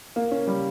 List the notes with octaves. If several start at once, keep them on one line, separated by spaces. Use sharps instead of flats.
A#3
C#4
G3